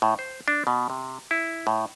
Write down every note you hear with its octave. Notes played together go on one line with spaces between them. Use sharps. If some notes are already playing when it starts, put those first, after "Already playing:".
A2
C5
D4
B2
C3
E4
A2